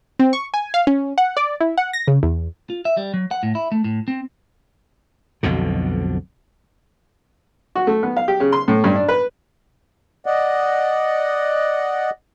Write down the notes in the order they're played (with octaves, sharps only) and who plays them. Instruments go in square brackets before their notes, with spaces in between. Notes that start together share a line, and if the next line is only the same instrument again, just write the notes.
[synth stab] C4
C#6
G#5
F5
C#4
F#5
D5
E4
F#5
A#6
C#3
E2
[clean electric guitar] F4
E5
G3
F#3
F#5
A2
E4
A3
A2
C4
[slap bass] B1 F2 B2 D3
[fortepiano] F#4
A3
B3
F5
G4
C#3
C6
A2
G2
D4
B4
[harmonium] D5 D#5 F#5